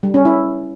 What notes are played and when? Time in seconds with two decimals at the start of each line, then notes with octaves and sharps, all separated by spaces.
0.03 G3
0.14 C#4
0.25 E4